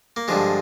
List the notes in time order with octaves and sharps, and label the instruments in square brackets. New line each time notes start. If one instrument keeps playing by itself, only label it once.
[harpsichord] A#3
G2 D3 F3 G#3